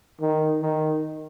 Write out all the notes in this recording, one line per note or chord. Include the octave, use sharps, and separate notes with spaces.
D#3
D#3